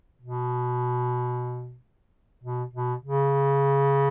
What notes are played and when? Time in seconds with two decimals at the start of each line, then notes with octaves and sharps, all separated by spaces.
0.22 B2
2.43 B2
2.74 B2
3.03 C#3